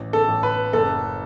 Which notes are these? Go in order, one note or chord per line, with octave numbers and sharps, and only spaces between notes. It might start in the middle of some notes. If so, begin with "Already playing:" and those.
Already playing: A1
A4
A1
B4
F#1 A4